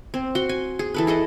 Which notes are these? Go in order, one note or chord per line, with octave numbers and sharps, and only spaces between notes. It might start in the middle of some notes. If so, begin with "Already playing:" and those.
C4
F#4 C6
G#5
G#4
E3 A4 B4
E4 G#4 A4 D#5